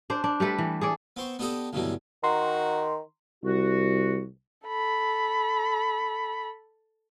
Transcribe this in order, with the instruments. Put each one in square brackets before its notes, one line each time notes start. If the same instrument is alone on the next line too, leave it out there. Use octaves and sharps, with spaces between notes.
[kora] D4 C5
D4
G3 A3 A4 B4
E3
G#4 A4 D5
[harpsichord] B3 C4 C5 C#6
B3 D4 G4 A4 D#5 G5
D2 G2 B2 D3 E3 F#3
[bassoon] D#3 [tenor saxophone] F#4 [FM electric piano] A#5 C6
[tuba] C2 [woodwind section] F#4
[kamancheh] A4 B5